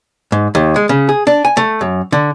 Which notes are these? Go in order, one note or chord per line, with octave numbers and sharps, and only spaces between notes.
G#2
D#2
G#3
C#3
G#4
D4
G#5
A3
F#2
D3